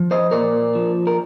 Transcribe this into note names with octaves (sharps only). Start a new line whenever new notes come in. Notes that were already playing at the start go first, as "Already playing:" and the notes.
Already playing: F3
C5 D#5
A#2 A#4 D5
F3
A#4